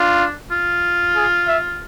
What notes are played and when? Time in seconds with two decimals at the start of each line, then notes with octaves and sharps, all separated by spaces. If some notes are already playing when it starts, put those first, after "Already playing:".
Already playing: D4 F4
0.51 F4
1.16 G#4
1.47 E5